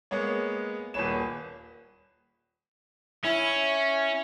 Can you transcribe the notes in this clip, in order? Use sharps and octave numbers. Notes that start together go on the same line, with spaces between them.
G#3 A#3 B3 C#5
D#1 A#3 G#4 B4 C#5 E7
C#4 E4